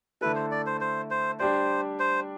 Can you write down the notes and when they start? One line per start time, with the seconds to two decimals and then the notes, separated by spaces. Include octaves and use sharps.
0.21 D3 A3 E4 A4 B4
0.36 C5
0.51 D5
0.66 C5
0.81 C5
1.11 C5
1.39 G3 D4 G4 C5 D5
2.00 C5